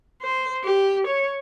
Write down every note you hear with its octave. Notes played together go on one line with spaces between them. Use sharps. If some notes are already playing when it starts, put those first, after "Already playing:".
C5
G4
C#5